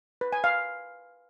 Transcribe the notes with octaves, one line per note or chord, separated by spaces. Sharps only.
B4
G#5
F5